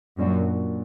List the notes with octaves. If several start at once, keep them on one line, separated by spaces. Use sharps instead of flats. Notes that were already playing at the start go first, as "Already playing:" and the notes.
F#2 A#2 F#3 D4 F#4